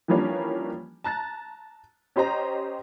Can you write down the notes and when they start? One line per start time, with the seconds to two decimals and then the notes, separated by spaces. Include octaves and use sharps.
0.08 E3 F3 G3 A#3 C#4 D4
1.04 A5 A#5 F#6 A6
2.16 C#4 G4 C5 D#5 A#5